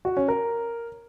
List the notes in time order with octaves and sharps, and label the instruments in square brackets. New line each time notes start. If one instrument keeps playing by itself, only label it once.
[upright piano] F#4
C#4
A#4